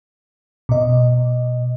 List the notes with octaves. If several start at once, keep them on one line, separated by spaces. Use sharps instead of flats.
B2 D#5